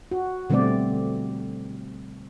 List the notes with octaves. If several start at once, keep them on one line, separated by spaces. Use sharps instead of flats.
F#4
B2 D3 G3 A3 C4 D5